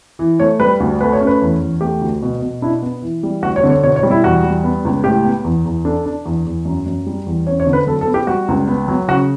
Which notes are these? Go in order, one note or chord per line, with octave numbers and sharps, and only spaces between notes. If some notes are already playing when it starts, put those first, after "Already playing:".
E3
A3 C#5
G3 B4
D2
A3 B4
C#5
C#4
B4
E2
E2
A3 G4
D2
B2
B2
D4 E4
B3
E3
G3
D2 F#4
C#5
D3
C#5
B2 C#5
C#5
G3
E4
E2 F#4
G3
B3
C#2
A2 G4
B3
E2
E2
D4 A4
D4
E2
E2
F#2
F#2
G3
E2
C#4 C#5
C#5
D3
B4
F#3 A4
A4
B3
G4
G3 F#4
C#2
B3
F#3
C#3 F#4